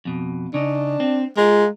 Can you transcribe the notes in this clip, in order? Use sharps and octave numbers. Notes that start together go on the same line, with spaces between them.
F2 B2
C#3 D4 D#4
C4
G#3 F4 A#4